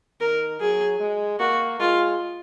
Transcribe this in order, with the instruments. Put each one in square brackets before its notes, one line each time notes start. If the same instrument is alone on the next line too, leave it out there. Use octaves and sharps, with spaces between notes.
[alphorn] D#3 [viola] A#4
[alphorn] F#3 [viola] G#4
[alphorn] G#3
[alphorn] A#3 [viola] F#4
[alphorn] G#3 [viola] F4